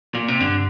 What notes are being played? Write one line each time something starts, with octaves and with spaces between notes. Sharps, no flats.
A#2
C3
G2 D3